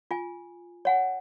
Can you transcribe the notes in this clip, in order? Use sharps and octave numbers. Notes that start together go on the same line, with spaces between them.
F4 G#5
C#5 F#5 G#5